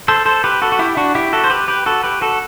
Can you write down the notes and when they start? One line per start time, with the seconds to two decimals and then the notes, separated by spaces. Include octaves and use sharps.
0.08 A4 C5
0.26 A4 C5
0.44 G4 B4
0.62 F#4 A4
0.72 F#4
0.79 E4 G4
0.97 D4 F#4
1.15 E4 G4
1.33 F#4 A4
1.44 C5
1.50 G4 B4
1.68 G4 B4
1.86 F#4 A4
2.04 G4 B4
2.21 F#4 A4